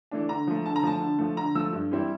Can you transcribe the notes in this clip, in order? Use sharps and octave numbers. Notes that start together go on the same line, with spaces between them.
E3 A3 D4
D3 A#5
F3 A3
D3 A5
A#5
F3 A3 A5
D3
F3 A3
D3 A#5
F3 A3 E6
G2
E3 G3 C4 E4